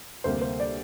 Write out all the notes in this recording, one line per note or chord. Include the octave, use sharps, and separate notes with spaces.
D2 C3 G3 A#3 C5
C5
D5